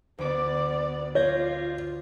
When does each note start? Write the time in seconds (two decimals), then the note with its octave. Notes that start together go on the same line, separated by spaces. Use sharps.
0.18 D2 B3 D5 D6
1.15 F4 C#5 G6 G#6 A#6